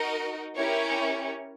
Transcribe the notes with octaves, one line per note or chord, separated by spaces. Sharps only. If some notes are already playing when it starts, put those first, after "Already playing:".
Already playing: D#4 F#4 A#4 D#5
C#4 E4 G4 A#4 C#5